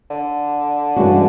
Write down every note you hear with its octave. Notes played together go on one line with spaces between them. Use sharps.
D3
G2 E3 G#3 C#4 F#4